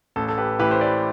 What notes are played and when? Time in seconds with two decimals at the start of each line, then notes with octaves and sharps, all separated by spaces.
0.16 A1 A4
0.29 A4
0.38 G4 B4
0.59 A2 E3 G4 B4
0.71 C5
0.81 B4 D5